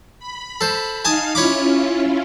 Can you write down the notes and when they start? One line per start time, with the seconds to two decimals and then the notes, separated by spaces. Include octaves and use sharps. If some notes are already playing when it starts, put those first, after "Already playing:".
0.19 B5
0.61 A4 C5
1.05 D#4 F5 G#5 A5 D#6
1.35 C#4 E4 F4 C#5 B5 D6